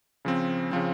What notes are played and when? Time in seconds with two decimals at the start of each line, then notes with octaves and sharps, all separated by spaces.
0.25 C#3 F3 C4
0.71 C#3 F3 C4